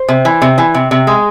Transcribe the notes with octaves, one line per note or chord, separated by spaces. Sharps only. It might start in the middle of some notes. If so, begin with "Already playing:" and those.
Already playing: C5
C3
E3
C3
E3
C3
C3
G#3